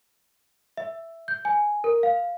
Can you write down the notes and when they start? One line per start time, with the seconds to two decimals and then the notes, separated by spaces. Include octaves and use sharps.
0.77 E5
1.28 G6
1.45 G#5
1.84 A#4
2.03 F5